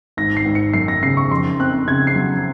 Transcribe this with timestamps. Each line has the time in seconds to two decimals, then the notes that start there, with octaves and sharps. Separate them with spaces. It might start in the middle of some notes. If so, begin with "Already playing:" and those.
0.17 G#1 A#6
0.37 C7
0.45 G#1
0.55 C#7
0.73 F#2 C7
0.88 A#6
1.03 C#3 C7
1.17 C#6
1.31 F2 C6
1.60 C4 F#6
1.87 C#3 G#6
2.07 C7
2.16 F#3